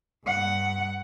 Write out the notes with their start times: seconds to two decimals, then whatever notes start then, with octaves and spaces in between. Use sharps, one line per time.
0.25 G2 F#5